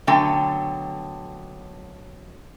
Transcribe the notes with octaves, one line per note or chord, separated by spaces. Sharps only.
B2 D3 F#3 A3 G5